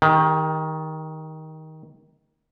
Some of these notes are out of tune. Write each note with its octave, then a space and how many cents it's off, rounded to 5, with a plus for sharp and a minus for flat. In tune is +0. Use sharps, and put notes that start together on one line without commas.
D#3 +15 G4 +40